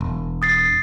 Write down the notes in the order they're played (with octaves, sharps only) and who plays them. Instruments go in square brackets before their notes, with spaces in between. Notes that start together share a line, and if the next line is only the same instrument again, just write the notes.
[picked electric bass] E1
[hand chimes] D#6 A6 C7